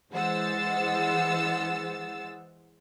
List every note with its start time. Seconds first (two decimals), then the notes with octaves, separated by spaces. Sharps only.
0.13 E3 G#3 C5 F#5 E6 A6